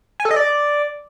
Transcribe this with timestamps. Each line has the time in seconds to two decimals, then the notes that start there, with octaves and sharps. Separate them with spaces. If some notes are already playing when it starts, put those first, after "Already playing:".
0.20 G#5
0.25 A4
0.31 D#5
0.36 D5